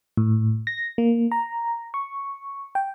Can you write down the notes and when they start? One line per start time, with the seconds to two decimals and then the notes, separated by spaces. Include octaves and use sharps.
0.17 A2
0.67 A#6
0.98 A#3
1.32 A#5
1.94 C#6
2.75 G5